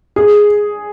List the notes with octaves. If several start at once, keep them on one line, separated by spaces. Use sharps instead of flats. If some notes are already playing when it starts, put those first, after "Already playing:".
G#4